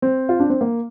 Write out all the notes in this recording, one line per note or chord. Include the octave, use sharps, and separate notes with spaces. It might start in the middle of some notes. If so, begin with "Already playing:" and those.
C4
F4
D4
C4
A#3